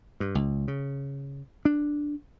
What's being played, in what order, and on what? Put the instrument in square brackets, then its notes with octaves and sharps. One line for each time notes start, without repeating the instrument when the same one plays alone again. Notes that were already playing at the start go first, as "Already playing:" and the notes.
[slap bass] G2
C#2
C#3
D4